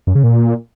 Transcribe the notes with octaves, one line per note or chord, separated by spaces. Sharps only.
F#2
C#3
A#2